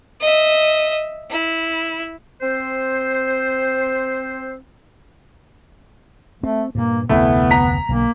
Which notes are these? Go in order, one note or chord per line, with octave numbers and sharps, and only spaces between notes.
D#5 E5
E4
C4 C5
A3 C4
G2 A#2 A#3
F1 D2 C3 A3 B3 E4
A#5 B6
B1 D3 A#3